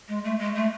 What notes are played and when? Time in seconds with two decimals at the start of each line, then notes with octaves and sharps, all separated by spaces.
0.08 G#3
0.24 A3
0.39 G#3
0.55 A3